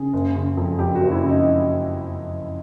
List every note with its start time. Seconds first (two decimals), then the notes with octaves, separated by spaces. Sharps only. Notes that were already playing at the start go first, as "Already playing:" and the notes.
Already playing: C#3 G#4
0.13 F#1
0.35 C#3
0.57 F2
0.79 F2 G4
0.95 F#4
1.01 F#1
1.12 E4
1.23 C#3
1.29 D#4